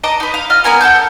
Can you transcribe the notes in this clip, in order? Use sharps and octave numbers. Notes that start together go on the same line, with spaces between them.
D#5 A5 A#5 D6
D#4 B4
F5
F4 D#5 F6
B3 A#4 G#5 A#5
A4 F#5 A5 G6